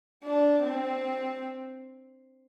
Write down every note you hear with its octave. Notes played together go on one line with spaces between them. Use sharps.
D4
C4